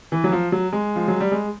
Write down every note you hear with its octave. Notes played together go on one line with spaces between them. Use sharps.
E3
F#3
F3
F#3
G#3
F3
F#3
G3
G#3